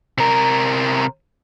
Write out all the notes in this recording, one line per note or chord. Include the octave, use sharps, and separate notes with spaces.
C3 A#4